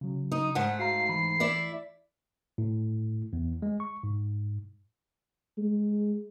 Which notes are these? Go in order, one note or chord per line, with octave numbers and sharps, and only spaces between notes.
C#3 F#3
D#4 D#6
G#2 G#3 A3 F#5
F#4 F5 A#5 C7
E3 B5
E4 D5 E5
A2
E2
G#3
C#6
G#2
G#3